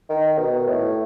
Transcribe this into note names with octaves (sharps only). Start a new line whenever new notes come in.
D#3
B2
A2